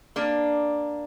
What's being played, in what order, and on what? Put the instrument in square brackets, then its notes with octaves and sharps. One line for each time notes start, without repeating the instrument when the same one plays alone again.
[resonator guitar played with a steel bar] A#3 D4